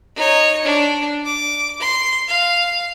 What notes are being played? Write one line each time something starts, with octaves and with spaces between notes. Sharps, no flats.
D#4 C#5
D4
D6
C6
F5